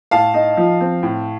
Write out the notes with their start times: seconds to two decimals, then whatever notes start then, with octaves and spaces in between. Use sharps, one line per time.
0.11 A2 F5 A5
0.34 D#4
0.57 F3
0.81 C4
1.03 A2